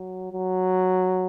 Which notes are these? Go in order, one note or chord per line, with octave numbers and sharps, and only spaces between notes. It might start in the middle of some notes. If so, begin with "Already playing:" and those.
Already playing: F#3
F#3